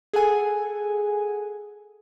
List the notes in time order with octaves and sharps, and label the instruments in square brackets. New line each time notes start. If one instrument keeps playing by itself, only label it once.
[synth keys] G#4 A4 F#5 G#5